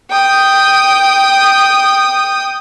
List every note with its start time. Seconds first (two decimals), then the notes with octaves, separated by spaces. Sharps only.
0.11 G5 D#6